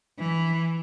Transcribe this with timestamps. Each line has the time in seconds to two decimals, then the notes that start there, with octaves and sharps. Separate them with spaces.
0.19 E3